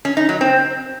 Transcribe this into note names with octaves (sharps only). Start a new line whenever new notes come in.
C#4
D#4
F#3
C4